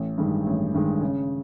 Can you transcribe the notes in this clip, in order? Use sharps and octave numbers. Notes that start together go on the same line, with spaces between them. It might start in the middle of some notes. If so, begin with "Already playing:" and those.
Already playing: A1
G2 D#3 G#3
A1
G2 D#3 G#3
C#3